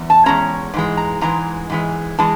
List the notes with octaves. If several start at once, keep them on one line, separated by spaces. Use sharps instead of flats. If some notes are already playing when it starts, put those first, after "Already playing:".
Already playing: E2
A5
E2 B2 G#3 C#4 A#5
G#2 E3 G#3
A#5
G#2 E3 G#3 A#5
G#2 E3 G#3
E3 G#3 A5